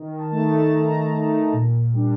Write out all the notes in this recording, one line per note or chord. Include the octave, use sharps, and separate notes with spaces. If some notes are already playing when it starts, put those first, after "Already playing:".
Already playing: D#3
A5
A3 D#4
A5
D#3 A#5
A3 D#4
A#2
G3 D4